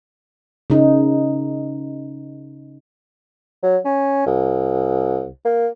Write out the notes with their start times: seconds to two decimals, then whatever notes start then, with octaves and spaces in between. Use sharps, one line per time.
0.70 C#3 D#4
3.63 F#3
3.85 C#4
4.27 C2
5.45 A#3